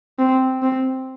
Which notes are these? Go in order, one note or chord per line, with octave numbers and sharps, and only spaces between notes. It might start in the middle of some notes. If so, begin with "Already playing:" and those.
C4
C4